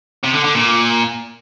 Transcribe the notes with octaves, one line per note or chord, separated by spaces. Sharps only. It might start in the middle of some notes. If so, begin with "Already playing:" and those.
C3
D3
D3
A#2